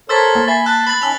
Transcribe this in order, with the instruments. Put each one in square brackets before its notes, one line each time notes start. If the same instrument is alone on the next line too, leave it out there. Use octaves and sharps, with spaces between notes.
[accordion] A4 A#4 C#5 [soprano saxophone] C5 [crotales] E6 A6 B6
[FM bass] A#3
[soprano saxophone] E5 [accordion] G#5 B5 [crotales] A6 C7
[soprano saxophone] A5 [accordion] E6 [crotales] F#6
[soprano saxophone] B5 [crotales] A6 F#7
[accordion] D#3 C#4 A5 [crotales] E6 F7